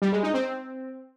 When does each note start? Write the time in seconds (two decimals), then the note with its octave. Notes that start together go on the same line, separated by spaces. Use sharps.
0.02 G3
0.12 G#3
0.23 D#4
0.34 C4